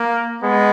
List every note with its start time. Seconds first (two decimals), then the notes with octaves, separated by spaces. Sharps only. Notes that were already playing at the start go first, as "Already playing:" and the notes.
Already playing: A#3
0.42 G#3 B3